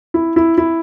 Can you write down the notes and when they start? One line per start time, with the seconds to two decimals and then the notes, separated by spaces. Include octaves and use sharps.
0.14 E4
0.36 E4
0.58 E4